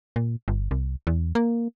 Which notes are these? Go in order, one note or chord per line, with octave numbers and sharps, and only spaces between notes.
A#2
G1
C2
E2
A#3